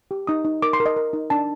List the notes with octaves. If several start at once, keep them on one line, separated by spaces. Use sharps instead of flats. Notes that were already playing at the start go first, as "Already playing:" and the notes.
G4
D#4 D#6
D#4
A#4 D6
C6
A#4
D#5
A#4
D#4
D4 A5